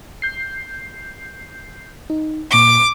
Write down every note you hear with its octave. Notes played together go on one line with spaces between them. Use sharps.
G6 C7
D#4
A#2 C#6 D6